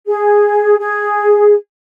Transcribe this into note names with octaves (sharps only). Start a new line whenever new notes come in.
G#4
G#4